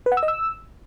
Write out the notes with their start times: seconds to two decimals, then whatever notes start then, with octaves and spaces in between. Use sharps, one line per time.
0.06 B4
0.12 F#5
0.17 E6
0.23 D#5
0.28 E6